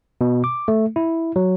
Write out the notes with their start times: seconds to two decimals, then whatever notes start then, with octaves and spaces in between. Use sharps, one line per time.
0.21 B2
0.44 D6
0.68 A3
0.96 E4
1.36 F#3